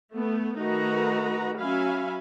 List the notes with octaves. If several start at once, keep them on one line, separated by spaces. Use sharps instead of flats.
A3 B3
D#3 A3 D#4 F#4 B4 A#5
F#3 C#4 E5 F5 G#5 B5